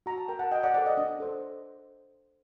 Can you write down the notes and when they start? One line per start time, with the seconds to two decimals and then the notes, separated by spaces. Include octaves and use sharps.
0.06 F#4 A#5
0.18 A5
0.28 A#4 G5
0.39 F#5 A5
0.51 F#4 D#5 G5
0.63 D5 F#5
0.74 A4 C5 D5 F#5
0.86 D#5
0.97 D4 D#5
1.20 A4 C5